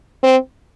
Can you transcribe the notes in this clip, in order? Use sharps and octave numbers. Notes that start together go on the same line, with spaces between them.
C4